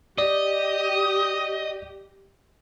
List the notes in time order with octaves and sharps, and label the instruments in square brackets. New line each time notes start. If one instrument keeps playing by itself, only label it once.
[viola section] G4 [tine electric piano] D5 [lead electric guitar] D#5